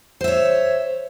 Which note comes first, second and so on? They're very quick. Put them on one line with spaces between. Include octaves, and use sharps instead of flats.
C5 E5 C#5